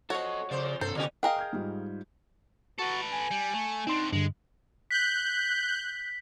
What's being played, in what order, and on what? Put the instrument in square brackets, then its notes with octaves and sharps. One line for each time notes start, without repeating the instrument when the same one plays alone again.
[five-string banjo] F3 F#4 [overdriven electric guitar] A4 D#5 [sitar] C#5
[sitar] F2 C5 [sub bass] C#3 [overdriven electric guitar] D5
[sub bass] G2 [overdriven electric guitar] C3 A#3 [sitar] A4 [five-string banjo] C5
[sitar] A#2 C#4 G4 [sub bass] D3
[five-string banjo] G#4 A#4 D#5 [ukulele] F5 G5
[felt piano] F6 G6 G#6
G#2 G3 F4
[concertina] F#4 A5 [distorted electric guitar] A4 B4
[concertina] G#5
[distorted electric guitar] G3
A3
[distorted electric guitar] C4 D4 [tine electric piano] D#4 C6
[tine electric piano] G2 D3 [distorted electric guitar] G#3
[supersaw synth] F#6 G6 [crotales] B6